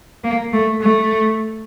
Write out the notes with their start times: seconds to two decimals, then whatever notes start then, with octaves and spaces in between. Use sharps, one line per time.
0.24 A#3
0.53 A3
0.82 A3